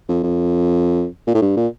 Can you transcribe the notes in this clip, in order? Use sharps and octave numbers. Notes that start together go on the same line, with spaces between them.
F2
F2
A#2
A2
G2
A#2